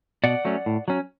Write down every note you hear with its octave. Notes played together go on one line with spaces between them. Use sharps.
B2 D5 F#5
F#3 A3 C#4
A2
F#3 C#4